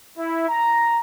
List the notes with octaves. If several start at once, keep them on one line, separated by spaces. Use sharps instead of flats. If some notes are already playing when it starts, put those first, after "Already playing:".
E4
A#5